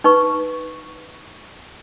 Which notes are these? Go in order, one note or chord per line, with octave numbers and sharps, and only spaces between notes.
D#4 B4 C#6